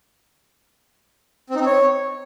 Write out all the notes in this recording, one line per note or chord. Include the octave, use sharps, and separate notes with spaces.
C4
D#4
C4
C#5